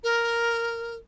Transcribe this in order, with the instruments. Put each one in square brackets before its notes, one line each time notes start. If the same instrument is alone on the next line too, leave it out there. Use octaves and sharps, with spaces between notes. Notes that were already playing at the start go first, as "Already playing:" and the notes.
[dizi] A#4